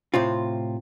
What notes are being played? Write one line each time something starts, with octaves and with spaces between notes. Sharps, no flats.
A2 C3 C4 F4